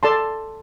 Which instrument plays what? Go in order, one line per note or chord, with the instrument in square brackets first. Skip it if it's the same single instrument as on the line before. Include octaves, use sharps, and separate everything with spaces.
[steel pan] A4 D5 A5 C6